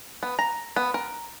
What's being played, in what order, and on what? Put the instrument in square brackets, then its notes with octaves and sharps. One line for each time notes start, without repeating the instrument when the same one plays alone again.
[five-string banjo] B3
A#5
B3
A#4